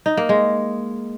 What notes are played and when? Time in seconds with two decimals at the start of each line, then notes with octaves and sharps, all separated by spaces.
0.06 D#4
0.17 A#3
0.29 G#3